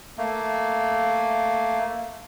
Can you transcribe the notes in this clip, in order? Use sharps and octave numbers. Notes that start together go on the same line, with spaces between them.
A3 A#3